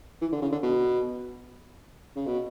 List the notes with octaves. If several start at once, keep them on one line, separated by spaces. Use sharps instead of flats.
E3
D3
C#3
D3
B2
C#3
B2